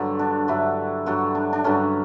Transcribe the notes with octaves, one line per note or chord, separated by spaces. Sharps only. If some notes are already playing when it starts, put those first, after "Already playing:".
Already playing: G2 D3 F#3
D4
G2 D3 F#3 E4
G2 D3 F#3 F#4
D4
D4
G2 D3 F#3 C#4